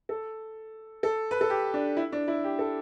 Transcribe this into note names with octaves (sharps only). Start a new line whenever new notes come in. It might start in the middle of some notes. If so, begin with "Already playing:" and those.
A4
A4
B4
A4
G4
D4
E4
D4
E4
G4
A4